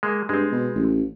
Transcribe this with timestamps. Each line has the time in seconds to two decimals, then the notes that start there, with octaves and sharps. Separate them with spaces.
0.03 G#3 A#3
0.29 G2 G#3 C4
0.52 B2
0.75 A1